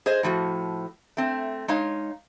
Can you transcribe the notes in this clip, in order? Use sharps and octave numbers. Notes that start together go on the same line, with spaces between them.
G#4 C5 D#5
A2 F3 F#4
A3 C4
G#3 D#4 C#5 F5